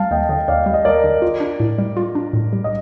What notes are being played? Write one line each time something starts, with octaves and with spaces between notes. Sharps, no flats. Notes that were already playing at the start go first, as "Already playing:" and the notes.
Already playing: G3 F5 A5
D#2 D#5 G5
D3 D#5 G5
D#2 D5 F5
G3
D#5
D#2 A#4 D5
D3
F4
D4
A2
G3
F4
D4
A2
G3
D#5